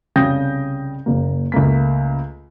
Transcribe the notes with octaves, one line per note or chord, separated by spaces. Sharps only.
C2 C#3 G5 D#6 G6 A#6
F#1 A#3
C#2 A3 A#3 B6